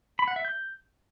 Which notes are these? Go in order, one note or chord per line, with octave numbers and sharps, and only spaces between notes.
B5
F#5
E5
G6